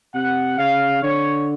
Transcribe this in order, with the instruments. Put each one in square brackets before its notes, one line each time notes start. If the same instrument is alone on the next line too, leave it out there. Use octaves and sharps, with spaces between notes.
[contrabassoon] C3 [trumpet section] F#5
[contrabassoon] C#3 [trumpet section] F5
[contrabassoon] D3 [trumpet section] C#5